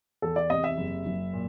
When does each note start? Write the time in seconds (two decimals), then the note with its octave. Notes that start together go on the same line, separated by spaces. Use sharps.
0.22 E2 A4
0.36 D5
0.50 C3 D#5
0.64 E5
0.78 F#1
1.06 F#1
1.33 A#2